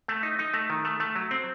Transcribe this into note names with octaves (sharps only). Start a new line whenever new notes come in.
A3
D#4
D#4
A3
D#3
A3
A3
F#3
C4